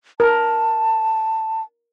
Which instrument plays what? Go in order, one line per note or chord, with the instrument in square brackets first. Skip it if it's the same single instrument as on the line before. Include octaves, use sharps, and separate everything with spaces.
[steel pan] A#4 [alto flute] A5